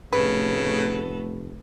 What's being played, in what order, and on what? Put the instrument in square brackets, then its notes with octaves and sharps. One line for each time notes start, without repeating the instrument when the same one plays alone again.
[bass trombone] F1 [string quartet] A2 B3 A4 [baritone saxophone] C#3 [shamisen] B4